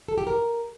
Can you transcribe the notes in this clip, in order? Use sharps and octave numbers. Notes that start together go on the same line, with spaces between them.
A4
G4
A#4